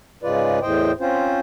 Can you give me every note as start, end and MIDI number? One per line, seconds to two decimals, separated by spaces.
0.23 0.59 44
0.23 0.59 49
0.23 0.59 56
0.23 0.59 65
0.23 0.59 71
0.23 0.59 74
0.62 0.92 40
0.62 0.92 45
0.62 0.92 72
0.62 0.92 75
0.62 0.92 79
1.00 1.40 60
1.00 1.40 61
1.00 1.40 65
1.00 1.40 72